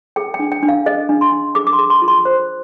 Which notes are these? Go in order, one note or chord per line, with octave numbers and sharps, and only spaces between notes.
G#4 G5
G5
D4
G5
D4
F5
G#4 D#5
D4
C6
D4
G#4 D6
D6
C6
G#4
C6
F4
C6
C5